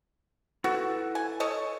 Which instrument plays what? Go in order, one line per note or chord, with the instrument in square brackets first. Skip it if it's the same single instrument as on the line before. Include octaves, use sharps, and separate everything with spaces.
[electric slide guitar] E4 A4 B4 [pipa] F#4
[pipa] G#5
A4 C#5 D#5